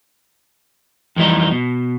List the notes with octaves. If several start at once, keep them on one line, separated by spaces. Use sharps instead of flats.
F2 E3 F#3 G3 D#4
B2